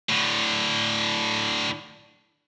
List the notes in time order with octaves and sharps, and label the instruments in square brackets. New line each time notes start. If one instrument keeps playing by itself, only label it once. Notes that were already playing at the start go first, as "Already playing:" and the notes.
[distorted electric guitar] A2 D3